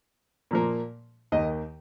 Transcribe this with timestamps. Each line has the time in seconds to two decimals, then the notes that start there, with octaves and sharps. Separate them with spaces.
0.51 A#2 F3 A#3
1.32 D#2 D#3 A#3 D#5